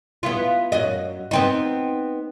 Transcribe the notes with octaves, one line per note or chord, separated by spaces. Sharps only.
B3 E4 F4
F#2 F#4 D#5
B3 C4 D#4